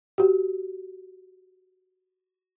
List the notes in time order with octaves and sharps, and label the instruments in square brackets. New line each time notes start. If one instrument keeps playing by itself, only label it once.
[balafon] F#4 G4